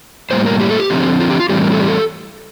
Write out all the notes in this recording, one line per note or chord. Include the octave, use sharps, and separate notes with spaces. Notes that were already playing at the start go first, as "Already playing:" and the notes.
A2 G3 A#3 C5
A#4
G4
A4
G4
D3 F3 C4
F4
G4
F4
A2 E3 G3 C4 G4
A#4
A4
G4
A4